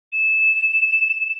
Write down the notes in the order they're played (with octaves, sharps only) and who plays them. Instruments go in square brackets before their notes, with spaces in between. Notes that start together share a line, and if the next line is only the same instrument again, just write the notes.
[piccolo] E7